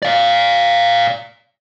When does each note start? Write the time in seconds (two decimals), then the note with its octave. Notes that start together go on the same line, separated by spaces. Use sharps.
0.02 D5 F5